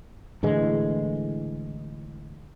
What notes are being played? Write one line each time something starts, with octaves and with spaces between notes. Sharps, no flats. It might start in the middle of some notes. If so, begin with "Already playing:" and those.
A2 D3 E3 G#3